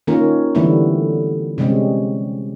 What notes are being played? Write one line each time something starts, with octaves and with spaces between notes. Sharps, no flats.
D#3 A#3 C#4 F4 A#4
D3 E3 G3 A3 B3 E4
C3 G3 G#3 C4 C#4